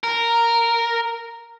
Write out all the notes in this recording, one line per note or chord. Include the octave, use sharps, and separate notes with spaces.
A#4